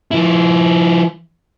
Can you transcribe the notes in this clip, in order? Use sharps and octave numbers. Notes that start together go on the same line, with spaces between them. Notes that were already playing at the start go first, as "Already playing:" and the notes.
F3 E4